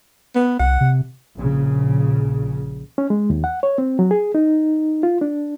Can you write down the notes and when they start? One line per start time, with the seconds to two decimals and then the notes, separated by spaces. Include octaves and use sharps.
0.35 B3
0.59 C2 F#5
0.81 C3
1.35 A#1 C#3
2.98 C#4
3.10 G#3
3.30 D#2
3.44 F#5
3.63 C#5
3.78 C4
3.99 F#3
4.11 G#4
4.35 D#4
5.03 F4
5.21 D4